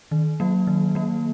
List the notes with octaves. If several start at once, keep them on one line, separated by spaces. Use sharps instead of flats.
D#3
F#3 A#3
D#3
F#3 A#3